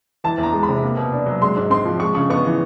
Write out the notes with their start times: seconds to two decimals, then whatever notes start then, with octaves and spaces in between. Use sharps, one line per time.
0.24 E3 A5
0.38 E2
0.43 A#5
0.53 G#3
0.63 B5
0.69 C3
0.83 A#3
0.97 B2
1.12 D4
1.26 F#3
1.42 G#3 C6
1.57 G#2
1.70 C4 C6
1.85 F3
2.00 G#3 C#6
2.15 C#3 C#6
2.30 B3 C#6
2.45 E3